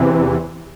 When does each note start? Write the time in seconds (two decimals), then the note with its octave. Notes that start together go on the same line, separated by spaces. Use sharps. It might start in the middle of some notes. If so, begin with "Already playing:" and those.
Already playing: E2 C3 E3